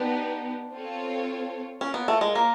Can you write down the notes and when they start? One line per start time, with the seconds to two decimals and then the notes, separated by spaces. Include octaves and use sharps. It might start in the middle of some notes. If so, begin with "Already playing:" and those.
Already playing: B3 D4 D#4 G4
0.73 C4 F4 A4 C#5
1.81 C#4 F4 A#4 C#5
1.94 B3
2.08 A3
2.21 G#3
2.35 A#3